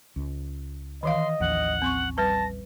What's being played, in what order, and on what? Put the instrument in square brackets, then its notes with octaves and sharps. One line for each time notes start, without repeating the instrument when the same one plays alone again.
[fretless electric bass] C#2
[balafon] D#3 E3 F5 [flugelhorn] D#5 [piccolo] C6
[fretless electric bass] A1 D#2 F3 [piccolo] F#5
[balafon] C4 C6 C#6
[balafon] G3 B4 [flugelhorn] A5 [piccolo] A#6